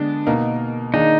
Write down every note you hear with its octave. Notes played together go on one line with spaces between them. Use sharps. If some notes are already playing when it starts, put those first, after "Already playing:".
Already playing: D3 G#3 B3 D4
B2 A#3 D#4 A#4
D#3 A#3 D4 D#4 G#4